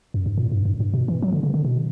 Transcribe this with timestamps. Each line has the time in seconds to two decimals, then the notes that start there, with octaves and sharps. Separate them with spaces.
0.14 F#2
0.26 G2
0.37 A#2
0.52 G2
0.65 F#2
0.80 G2
0.94 B2
1.08 E3
1.22 F#3
1.32 D3
1.43 C#3
1.54 D3
1.65 B2